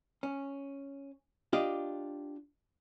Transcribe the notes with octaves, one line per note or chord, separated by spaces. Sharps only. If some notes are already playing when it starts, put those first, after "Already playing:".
C#4
D4 F4 G4 D#5